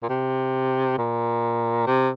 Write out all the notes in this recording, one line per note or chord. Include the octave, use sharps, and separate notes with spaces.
A#2
C3
A#2
C3